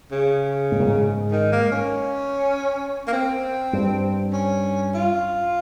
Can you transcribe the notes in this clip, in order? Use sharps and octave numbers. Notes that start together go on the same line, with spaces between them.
C#3
G#2
A#2
G#2
D#3
A#3
C#4
A#3
C4
G2
C#4
F4